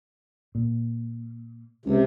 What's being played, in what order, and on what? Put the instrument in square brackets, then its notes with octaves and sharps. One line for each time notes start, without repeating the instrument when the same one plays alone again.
[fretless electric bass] A#2
[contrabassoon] C#2 [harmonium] C3